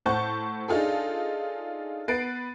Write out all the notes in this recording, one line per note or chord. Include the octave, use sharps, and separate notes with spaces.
A2 C5 F#5 A5 C#6 G6
D4 D#4 F4 G#4 A4
B3 B4 A6 C7 D7